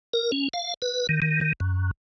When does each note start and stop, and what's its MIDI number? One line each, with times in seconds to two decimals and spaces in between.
0.14 0.31 70
0.32 0.48 61
0.54 0.74 77
0.82 1.07 71
1.09 1.20 51
1.22 1.40 51
1.41 1.53 51
1.60 1.91 42